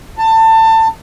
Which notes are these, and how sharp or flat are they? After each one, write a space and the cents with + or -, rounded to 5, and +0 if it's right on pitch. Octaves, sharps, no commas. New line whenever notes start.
A5 +25